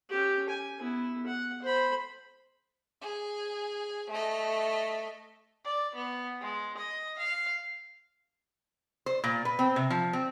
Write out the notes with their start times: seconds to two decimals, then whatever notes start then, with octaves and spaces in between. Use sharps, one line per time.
0.10 C#4 G4
0.49 G#5
0.79 B3 E4
1.26 F#5
1.62 C5 B5
3.02 G#4
4.11 A3 D#5
5.65 D5
5.95 B3
6.41 G#3
6.77 D#5
7.18 F5
9.06 C5
9.24 A#2
9.45 B4
9.59 C4
9.76 C3
9.90 F3
10.13 C4